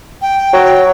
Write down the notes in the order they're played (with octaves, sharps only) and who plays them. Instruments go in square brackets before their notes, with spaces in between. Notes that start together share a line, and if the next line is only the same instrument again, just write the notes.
[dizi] G5
[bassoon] F#3